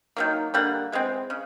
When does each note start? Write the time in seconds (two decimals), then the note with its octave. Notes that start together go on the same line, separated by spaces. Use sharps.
0.17 D#3 F#3 A#3
0.54 D3 G3 A#3 F#5
0.92 E3 G#3 C4
1.30 C#3